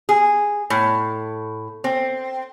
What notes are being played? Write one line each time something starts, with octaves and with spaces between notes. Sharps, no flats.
G#4
A2
C4